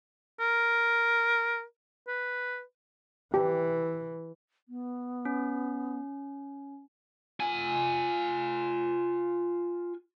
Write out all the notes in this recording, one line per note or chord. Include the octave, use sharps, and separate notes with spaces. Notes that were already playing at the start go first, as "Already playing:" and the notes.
A#4
B4
E3 G4
B3
C#4
F4 G#5